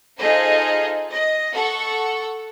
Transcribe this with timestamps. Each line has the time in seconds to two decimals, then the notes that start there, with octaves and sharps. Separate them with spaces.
0.18 D#4 F4 G#4 A4 C5 D#5
1.12 D#5
1.54 A4 F#5 C#6